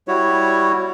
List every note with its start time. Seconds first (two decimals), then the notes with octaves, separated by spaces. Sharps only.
0.08 G3 E4 F#4 C#5